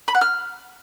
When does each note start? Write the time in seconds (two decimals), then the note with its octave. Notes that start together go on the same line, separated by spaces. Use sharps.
0.08 B5
0.15 F#5
0.21 F6